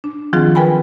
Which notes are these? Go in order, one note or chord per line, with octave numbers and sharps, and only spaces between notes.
D4
D#3 F3 F#3 C4 F4 G#4
A#4 B4 G5 G#5 B5